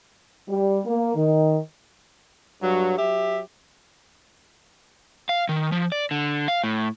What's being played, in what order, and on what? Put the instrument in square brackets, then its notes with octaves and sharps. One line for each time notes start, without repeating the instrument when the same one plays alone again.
[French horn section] G3
A#3
D#3
[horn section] G2 F#3
F#3 G4 E5
[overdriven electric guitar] F5
D#3
F3
D5
D3
F5
A2